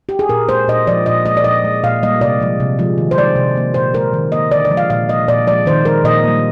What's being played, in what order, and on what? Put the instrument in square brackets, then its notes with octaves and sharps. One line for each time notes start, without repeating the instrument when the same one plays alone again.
[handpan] G4
G#4
A#2 A#4
G#3 C5
A#2 D#5
F3 G#3 D5
A#2 D#5
G#3 D#5
D5
A#2 D#5
G#3
A#2 F5
G3 A#3 D#5
C3 D5
F3 G#3
C3
F3 G#3
D#3
C5
G#3 D5
C3
F3 A#3
A#2 C5
G#3 A#4
D#3
A#3 D#5
D3 D5
D5
F3 G#3
F5
A#2 F5
G#3 D#5
A#2 D5
F3 G#3 D5
D#3 C5
G#3 A#4
A#2 D#5
G3 A#3